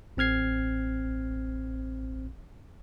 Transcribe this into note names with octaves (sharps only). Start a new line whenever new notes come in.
A1 C4 F6 G#6 C7